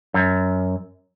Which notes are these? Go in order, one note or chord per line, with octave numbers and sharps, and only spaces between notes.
F#2